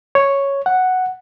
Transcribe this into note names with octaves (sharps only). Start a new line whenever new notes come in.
C#5
F#5